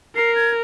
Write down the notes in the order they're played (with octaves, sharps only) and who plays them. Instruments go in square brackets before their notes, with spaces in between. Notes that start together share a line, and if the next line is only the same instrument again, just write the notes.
[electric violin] A#4 [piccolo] C7
[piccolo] G#6